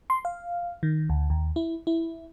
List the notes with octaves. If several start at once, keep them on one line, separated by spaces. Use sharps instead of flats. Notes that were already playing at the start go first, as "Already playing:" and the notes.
C6
F5
D#3
D2
D#2
E4
E4